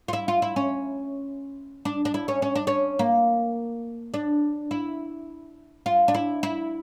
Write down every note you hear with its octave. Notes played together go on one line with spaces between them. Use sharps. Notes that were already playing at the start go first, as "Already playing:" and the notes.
F4
E4
F4
E4
C#4
D4
D4
E4
C#4
C#4
D4
C#4
A#3
D4
E4
F4
D4
E4
E4